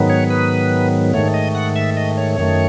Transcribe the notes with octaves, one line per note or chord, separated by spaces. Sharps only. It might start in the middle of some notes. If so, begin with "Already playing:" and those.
Already playing: G#2 D#3 F#3 B3
C#5
B4
G#2 D#3 A3 C#5
D#5
F#5
E5
D#5
C#5
F#2 D#3 A3